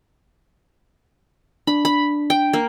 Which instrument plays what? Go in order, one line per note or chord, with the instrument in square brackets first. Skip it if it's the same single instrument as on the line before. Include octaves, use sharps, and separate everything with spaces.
[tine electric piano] D4 [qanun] B5
[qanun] B5
G5
A#3